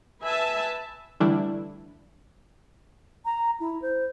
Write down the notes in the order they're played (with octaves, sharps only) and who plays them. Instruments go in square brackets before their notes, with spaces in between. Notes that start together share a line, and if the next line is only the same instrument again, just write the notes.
[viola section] B4 E5 G#5 A5
[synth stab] D3 E3 G3 A3 D4 E4
[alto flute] A#5
E4
C5